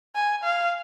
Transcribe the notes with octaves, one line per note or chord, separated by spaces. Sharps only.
G#5
F5